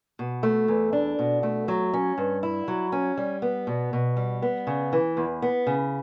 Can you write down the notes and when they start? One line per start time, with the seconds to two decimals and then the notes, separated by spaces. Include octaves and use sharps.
0.19 B2
0.43 A3
0.68 E2
0.93 D4
1.19 B2
1.43 A3
1.68 F#3
1.94 C#4
2.18 G2
2.43 E4
2.68 F#3
2.92 C#4
3.18 G3
3.42 B3
3.67 B2
3.93 B2
4.17 G3
4.42 B3
4.67 C#3
4.93 E3
5.17 E2
5.42 B3
5.67 C#3